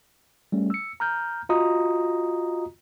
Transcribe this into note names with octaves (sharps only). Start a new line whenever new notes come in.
G3 A3 C#4
E6 C#7
A#5 F6 G6
F4 F#4 D#5 A#5 D#6